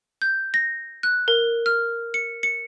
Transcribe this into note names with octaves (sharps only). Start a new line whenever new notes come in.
G6
A#6
F#6
A#4
F6
C#7
C#7